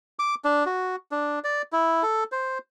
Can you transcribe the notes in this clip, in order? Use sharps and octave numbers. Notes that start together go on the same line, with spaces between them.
D6
D4
F#4
D4
D5
E4
A4
C5